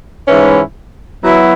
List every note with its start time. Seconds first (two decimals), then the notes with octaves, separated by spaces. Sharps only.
0.26 G#2 E3 C#4 E4
1.24 F#3 B3 E4